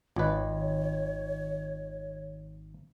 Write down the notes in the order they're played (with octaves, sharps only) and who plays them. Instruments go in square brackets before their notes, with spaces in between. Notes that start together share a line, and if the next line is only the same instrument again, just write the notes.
[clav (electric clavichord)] G#1 B4 [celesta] F4 D#5 [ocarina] C#5